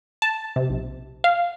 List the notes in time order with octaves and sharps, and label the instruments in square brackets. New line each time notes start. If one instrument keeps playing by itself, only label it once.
[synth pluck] A5
C3
B1
F5